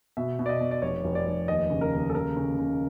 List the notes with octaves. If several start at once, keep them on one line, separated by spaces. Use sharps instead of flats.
B2 E5
B2
D5
D#5
B2
D5
F1 C#5
F1
D5
F1
D#2 D#5
C#3
A#4
D#2
A4
C#3 A#4
C#3
C#3